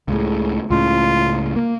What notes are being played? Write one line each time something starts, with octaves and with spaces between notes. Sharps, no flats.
C#2 A2 C#3
C#2 A2 C#3 F4
A#3